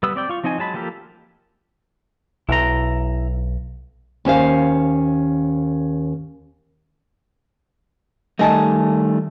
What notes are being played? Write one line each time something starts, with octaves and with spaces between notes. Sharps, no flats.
G3 B3 B4 D#6 E6
C4 D5 G5
F4 C#6
F3 C4 D#4 D#5 G#5
F#3 G#3 A5 B5
F3 A#3 G4 A4 A#4
B1 E4 A#5
D#2 C#4 C5 F5
D#3 G3 A3 D#5 G#5 A5